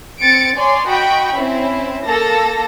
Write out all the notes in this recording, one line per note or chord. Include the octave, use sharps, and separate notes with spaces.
C4 A6 C#7 D7
C#5 D5 G#5 C6
F#4 D#5 G5 B5 C#6
C4 C#4 E4
A#3 A4 A5 A#6